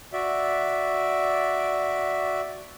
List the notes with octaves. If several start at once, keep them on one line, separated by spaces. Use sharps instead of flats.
F#4 D5 E5